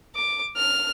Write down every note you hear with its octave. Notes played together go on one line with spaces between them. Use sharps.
D6
F6